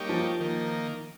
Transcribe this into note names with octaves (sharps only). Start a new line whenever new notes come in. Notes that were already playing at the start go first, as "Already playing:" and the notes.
Already playing: G3 A#3 D#4 G4 C#5
F3
D#3 A#3